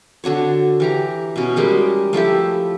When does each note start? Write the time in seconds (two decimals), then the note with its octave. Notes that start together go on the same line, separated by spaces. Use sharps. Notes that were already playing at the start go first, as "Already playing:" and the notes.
0.24 D3 D4 F#4 C#5
0.80 E3 G4 A#5
1.36 B2 C#4
1.56 G3 G#3 G4 A#4
2.13 F3 A3 E4 G4